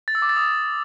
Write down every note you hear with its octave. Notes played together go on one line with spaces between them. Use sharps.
A6
E6
D6
A6
D#6